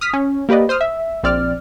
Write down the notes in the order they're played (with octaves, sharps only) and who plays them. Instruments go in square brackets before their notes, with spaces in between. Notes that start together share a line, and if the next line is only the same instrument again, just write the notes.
[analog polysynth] D#6 F6 B6
C#4
A#3 G4 B4 D5 D#5
C5 D#6 F6
E5
A#1 C4 D5 F6